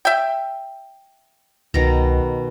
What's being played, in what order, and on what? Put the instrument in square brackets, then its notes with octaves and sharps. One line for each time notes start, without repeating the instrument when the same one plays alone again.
[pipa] E5 G5
[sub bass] C2 [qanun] B2 D#3 A#5